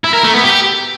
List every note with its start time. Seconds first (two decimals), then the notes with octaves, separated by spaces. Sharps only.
0.04 E4
0.14 A#4
0.24 A3
0.34 B3
0.44 G4